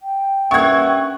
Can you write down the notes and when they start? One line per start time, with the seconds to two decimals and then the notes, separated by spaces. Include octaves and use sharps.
0.01 G5
0.51 G2 C#4 A#4 E5 F#5 C#6 G#6